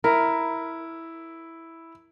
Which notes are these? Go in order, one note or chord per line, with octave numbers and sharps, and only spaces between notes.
E4 A#4